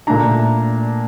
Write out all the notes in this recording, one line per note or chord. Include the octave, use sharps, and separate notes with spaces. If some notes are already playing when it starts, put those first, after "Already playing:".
A#2 A3 D4 A#5